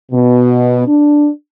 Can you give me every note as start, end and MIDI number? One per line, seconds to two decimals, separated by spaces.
0.12 0.87 47
0.87 1.28 62